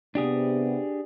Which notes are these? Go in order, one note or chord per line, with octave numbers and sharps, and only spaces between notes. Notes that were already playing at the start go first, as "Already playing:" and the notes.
C3 B3 D4 G4 G#4